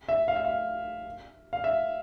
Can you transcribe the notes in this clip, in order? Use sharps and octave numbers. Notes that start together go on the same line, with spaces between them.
E5
F5
E5
F5
F5
E5